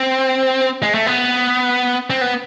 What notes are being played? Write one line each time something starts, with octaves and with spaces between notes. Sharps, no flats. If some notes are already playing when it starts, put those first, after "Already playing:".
Already playing: C4
G#3
A3
B3
C4
B3